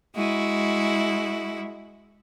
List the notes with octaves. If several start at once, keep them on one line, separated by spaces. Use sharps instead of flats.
G#3 E4 F#4